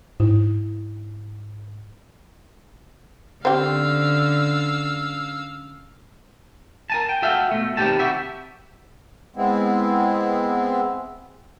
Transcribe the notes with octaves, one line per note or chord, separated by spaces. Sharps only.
G#2 E4
D3 C4 C#4 G4 F5 E6
A#4 G#5 A5
G5
F#4 A4 E5 F5 G5
B2 A3
D#2 C3 G3 C#4 G4 A5
F#4 G4 E5
G#3 B3 C4 E4